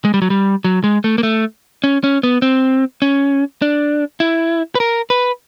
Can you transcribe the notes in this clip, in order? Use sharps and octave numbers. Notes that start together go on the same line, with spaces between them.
G#3
G3
F#3
G3
F#3
G#3
A3
A#3
A3
C#4
C#4
B3
C4
C#4
D4
E4
B4
A#4
B4